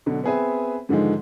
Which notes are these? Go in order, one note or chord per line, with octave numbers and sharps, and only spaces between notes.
B2 D3 F#3
B3 C4 G#4 B4 E5
G#2 D3 D#3 F3 G#3